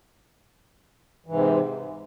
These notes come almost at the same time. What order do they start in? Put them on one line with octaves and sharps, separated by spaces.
E3 G#2 C3